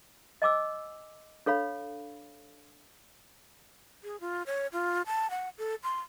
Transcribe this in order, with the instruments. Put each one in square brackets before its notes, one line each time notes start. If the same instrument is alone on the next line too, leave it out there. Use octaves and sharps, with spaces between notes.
[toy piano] D#5 G#5 D6 E6
D4 A4 C#5 F5 B5
[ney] G#4
F4
C#5
F4
A5
F#5
A4
C6